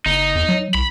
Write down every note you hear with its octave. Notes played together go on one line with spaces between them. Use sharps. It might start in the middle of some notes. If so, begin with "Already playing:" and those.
F#1 D#4
E2
F#3
C2 B5